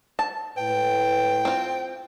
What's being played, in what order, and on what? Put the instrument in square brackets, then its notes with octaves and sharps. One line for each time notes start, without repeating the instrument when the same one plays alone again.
[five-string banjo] A5
[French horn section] A2 B4 [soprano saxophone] G5
[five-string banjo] C4 F4